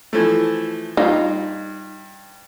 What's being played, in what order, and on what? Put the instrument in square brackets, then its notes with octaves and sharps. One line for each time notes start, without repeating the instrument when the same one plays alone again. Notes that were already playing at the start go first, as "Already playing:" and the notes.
[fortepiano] E3 F3 A3
[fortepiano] G2 [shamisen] D#4 F4